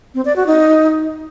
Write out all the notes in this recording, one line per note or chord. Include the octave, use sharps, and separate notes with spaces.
C4
D5
F#4
D#4